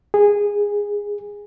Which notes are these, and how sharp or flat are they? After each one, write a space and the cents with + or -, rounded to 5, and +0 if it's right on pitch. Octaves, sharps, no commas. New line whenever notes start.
G#4 -15